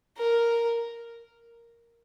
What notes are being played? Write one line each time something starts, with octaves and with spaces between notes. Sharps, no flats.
A#4